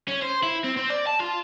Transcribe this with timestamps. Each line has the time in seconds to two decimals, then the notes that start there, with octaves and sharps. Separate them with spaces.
0.08 C#4
0.22 C5
0.43 E4
0.64 C4
0.77 C4
0.90 D5
1.07 A5
1.20 F4